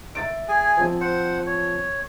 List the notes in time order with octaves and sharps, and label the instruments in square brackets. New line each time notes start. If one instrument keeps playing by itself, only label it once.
[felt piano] E5 A6 D7
[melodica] G#4 G#5
[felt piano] F3 C4
[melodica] C5 F#5
C#5